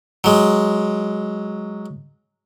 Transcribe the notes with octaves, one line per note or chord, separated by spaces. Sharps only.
F#3 G#3